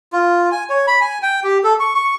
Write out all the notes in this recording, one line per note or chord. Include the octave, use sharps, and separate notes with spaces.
F4
G#5
C#5
B5
G#5
G5
G4
A4
C#6
C#6